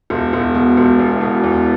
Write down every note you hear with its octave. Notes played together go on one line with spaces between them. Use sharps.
E1
E1
B2
E1
E2
B2
E2